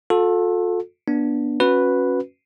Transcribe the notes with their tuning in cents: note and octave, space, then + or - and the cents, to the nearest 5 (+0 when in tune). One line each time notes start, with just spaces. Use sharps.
F4 +45 A4 +0
B3 -30 D4 +0
C#4 -15 F#4 -20 B4 +0